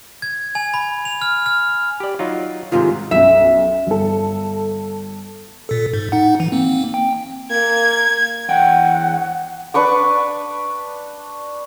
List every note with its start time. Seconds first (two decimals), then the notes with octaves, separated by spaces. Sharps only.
0.22 G#6
0.55 G#5
0.74 B5
1.05 F7
1.22 F6
1.46 F6
2.00 G4 D5
2.19 F#3 D#4 F4
2.72 G#2 C3 D#3 F4
3.11 B1 F#2 E5
3.87 G1 A4
5.69 A#2 A4
5.94 G#2
6.12 D#4 F#5
6.40 E3
6.52 A#3 C4
6.94 G5
7.51 A#3 G#6
8.49 E2 F#5 G5
9.74 D4 B4 C#6 D6